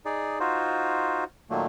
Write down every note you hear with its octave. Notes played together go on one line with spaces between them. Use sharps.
D#4 G#4 D5
D#4 F4 F#4 C5
A#2 D#3 F#3 A3 A#3